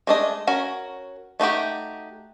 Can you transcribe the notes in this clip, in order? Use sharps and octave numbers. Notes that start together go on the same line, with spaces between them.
G#3 A3 D4 C5 D#5
C#4 F#4 A#4
A3 D#4 F#4 G4